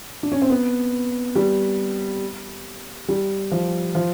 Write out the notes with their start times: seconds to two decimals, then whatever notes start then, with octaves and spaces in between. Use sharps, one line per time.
0.23 D4
0.32 C#4
0.42 C4
0.50 B3
1.35 G3
3.08 G3
3.51 F3
3.95 F3